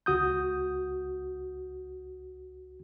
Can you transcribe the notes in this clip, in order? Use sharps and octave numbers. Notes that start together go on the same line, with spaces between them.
C#2 F#4 D#6 G6